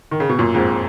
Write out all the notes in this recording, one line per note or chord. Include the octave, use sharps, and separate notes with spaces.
D#3
C#3
B2
F#2 A#2
F2 G#2